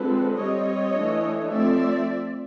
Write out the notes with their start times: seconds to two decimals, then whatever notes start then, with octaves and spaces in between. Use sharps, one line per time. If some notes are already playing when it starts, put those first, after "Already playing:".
Already playing: D3 F3 G#3 C4 A4 B4
0.35 G3 C4 C#5 D#5
0.95 E3 A3 D4
1.52 F3 A3 C4 D5 E5